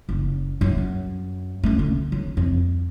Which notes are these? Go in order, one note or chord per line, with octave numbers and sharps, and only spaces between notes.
F#1
F#2
A3 C#4
D3
F#3
F2